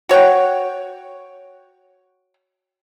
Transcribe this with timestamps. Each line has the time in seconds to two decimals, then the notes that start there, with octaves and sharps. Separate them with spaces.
0.09 F#4 C#5 F#5 G5